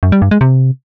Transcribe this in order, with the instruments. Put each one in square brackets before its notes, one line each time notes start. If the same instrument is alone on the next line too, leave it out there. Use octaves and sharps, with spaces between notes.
[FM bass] F#2
G3
G2
G#3
C3